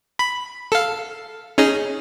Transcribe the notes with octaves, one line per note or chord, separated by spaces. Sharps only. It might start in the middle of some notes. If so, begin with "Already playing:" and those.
B5
A4 F5
C#4 D#4 G#4